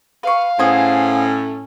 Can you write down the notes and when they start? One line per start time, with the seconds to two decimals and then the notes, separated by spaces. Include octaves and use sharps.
0.23 B4 F5 C#6
0.59 A2 B3 C#4 G#4 C5